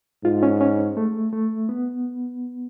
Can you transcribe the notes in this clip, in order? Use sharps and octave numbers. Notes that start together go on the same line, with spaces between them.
G#2 F4
C#4
C#4
A3
A3
B3